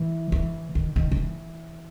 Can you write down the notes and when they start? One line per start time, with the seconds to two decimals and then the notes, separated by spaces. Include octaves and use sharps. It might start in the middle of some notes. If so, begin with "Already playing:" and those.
Already playing: E3
0.32 E3
0.75 D#3
0.96 D#3
1.11 D#3
1.16 E3